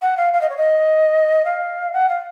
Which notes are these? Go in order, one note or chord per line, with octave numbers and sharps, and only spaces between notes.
F#5
F5
F5
D#5
C#5
D#5
F5
F#5
F5